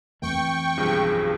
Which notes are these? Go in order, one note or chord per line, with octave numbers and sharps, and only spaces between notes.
F2 E3 A3 G5 C#6
B1 G2 F3 G#4